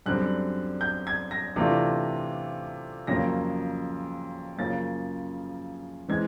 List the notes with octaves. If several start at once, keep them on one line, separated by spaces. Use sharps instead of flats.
F#2 D3 G3 C4 F#6
G6
G#6
A#6
C3 E3 A3 D4 F4
F2 C#3 F#3 A#3 C#4 A#6
F#2 C#3 F3 A#3 C#4 A6
E3 G#3 C4 G#6